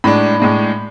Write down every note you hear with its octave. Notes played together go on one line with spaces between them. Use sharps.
A2 G#3 D4 B5
A2 G#3 D4